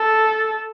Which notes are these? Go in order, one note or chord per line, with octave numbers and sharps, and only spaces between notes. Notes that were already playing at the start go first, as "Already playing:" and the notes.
Already playing: A4